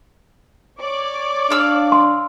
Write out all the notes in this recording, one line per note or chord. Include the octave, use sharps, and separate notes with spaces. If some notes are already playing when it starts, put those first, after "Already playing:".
C#5 D5 D6
D4 F5 E6
C6